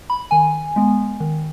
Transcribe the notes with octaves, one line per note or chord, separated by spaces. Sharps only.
B5
D#3 G#5
G#3 B3
D#3